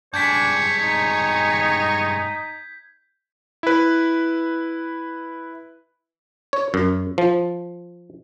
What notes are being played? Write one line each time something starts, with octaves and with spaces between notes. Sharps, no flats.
G2 G#3 D4 C#5 G6 G#6 B6
D#4
E4 B4
C#5
F#2
F3